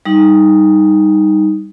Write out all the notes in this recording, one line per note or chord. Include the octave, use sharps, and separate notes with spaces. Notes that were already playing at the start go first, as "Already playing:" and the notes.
G3 D#4